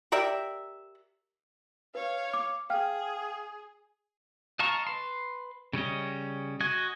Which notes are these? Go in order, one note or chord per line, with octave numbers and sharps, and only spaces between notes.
G4 A#4 D5 E5
B4 C#5 F5
D6
G#4 F5 G5 F6
D#5 F5 A5 A#5 C#6
B4 C6
C#3 G3 C#4 D#5
F#4 D#5 G#5